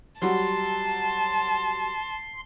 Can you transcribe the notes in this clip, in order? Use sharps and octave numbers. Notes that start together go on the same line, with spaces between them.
F#3 G3 F#4 A5 C6